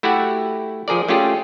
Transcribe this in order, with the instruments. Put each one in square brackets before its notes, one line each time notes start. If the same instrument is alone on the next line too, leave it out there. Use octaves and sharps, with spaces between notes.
[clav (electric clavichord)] A3 E4 F#4 G4 F#5
F3 G#4 A#4 D5
A3 C#4 F4 G4 G#4